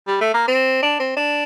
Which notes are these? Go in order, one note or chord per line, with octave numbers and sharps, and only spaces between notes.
G3
A3
A#3
C4
D4
C4
D4